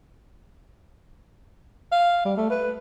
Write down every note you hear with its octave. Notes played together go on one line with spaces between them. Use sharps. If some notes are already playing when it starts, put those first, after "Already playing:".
F5
G3
A3
B4